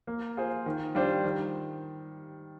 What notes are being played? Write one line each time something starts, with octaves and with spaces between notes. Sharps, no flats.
A#3
F4 G#4 C5
D#3
G3 D4 F4 C5
D#3